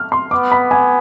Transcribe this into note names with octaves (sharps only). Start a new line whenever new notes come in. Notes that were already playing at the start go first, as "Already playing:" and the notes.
Already playing: F6
C6
B3 D6
B5
G#5